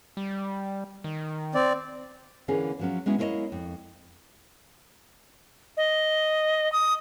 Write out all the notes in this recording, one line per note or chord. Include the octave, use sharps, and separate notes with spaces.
G3
D#3
C4 D5
D3 E3 A#3 C#4 G#4
F3 F#3 C#4
G#3 B3 C#4 E4 F#4
G#3 A#3 E4 A4 C#5 D#5
F2
D#5
D#6